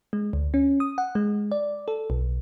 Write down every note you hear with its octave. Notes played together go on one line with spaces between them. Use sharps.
G#3
D2
C#4
D#6
F#5
G#3
D5
A4
B1